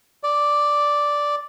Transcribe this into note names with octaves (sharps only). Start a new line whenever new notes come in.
D5